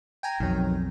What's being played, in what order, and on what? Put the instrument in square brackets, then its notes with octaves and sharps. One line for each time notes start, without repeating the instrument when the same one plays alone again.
[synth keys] G5 G#5 A#5
[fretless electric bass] B1 F2 [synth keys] D#3 F#3